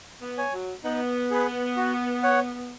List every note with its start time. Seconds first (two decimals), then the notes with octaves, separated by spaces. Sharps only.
0.21 B3
0.38 C#5 G#5
0.53 F#3
0.84 B3 D#4
1.31 G#4 B4
1.76 F#4
2.23 C#5 F#5